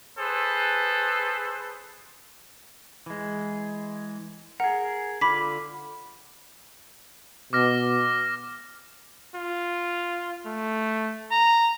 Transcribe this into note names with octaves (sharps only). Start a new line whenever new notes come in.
G#4 A4 B4 C5
E3 G#3
G#4 A#4 F#5
D3 F4 B5 D6 B6
B2 D6 F6 A#6
F4
A3
A#5